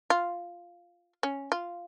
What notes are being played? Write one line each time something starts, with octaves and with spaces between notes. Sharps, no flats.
F4
C#4
F4